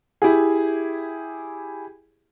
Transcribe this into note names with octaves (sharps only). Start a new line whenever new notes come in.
E4 G4 G#4